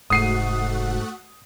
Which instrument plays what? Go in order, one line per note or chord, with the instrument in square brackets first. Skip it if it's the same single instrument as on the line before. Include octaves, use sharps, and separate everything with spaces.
[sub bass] F1 [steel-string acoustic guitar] G#2 [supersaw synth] A3 F#4 F#5 [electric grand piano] D#6 C7 D#7